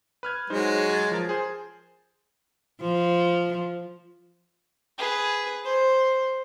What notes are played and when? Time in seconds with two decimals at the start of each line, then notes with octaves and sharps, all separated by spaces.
0.23 B4 F6 G#6
0.50 F#3 G#3 D#4 C5
0.77 C#5
0.90 G#6 A6
1.11 F3 A#4
1.29 G#4 C5
2.80 F3
4.98 G#4 B4
5.64 C5